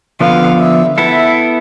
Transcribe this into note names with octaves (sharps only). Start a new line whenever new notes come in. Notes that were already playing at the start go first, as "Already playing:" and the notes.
D3 F3 B3 F5
E5
B3 E4 A4 E5